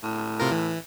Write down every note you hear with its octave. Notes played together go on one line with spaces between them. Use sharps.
A2
C3 F4 A#4
E3